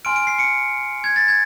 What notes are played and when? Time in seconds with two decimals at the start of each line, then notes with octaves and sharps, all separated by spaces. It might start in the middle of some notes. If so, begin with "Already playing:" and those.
0.05 G#5 C6 F6 D7
0.16 D7
0.27 C7
0.39 C#7
1.04 G#6
1.16 A6
1.28 G#6